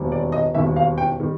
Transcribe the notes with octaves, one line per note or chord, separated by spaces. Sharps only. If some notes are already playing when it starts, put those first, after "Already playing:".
Already playing: E1 D#2 D#3 G3
D5
D#5
E1 D#2 D#3 G3 E5
F5
G5
D#3 G3